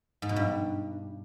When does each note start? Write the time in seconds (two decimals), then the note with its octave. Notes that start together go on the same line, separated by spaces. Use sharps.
0.22 G#2
0.29 B2
0.36 G2